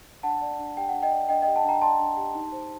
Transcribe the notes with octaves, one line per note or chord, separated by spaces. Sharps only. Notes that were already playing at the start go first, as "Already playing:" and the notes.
D4 F#5 A5
D5
D4
G4 G5
D4 F#5
D#5 G5
D5
D4 D#5 G5
G4 D#5 G5
F#5 A5
D4 G5 A#5
D5 A5 C6
D4
G4
D#4
C5